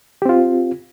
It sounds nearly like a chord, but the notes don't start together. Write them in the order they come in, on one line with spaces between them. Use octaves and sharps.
G4 C4 F4